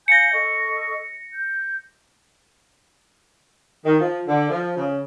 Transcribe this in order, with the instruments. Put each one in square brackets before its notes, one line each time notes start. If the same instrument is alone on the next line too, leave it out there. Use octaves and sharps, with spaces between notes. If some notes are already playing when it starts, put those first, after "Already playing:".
[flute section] F5 G#5 G6 [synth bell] A#6 C#7
[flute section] A4 D#5 C#6
G6
[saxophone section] D#3
F3
D3
F3
C#3